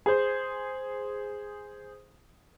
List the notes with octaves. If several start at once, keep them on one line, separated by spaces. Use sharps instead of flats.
G#4 C5